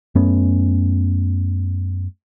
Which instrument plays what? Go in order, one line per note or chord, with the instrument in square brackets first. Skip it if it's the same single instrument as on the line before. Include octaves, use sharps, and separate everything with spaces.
[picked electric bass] F#2 A3 B3 C#4